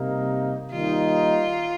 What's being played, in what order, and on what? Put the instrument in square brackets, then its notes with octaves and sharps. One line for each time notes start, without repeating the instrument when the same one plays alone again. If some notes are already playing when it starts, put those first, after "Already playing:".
Already playing: [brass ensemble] C3 G3 A#3 D#4
[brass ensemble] D#3 G3 A#3 D#4 [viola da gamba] F4